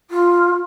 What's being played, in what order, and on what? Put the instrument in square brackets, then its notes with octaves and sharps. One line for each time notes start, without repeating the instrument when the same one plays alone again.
[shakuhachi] F4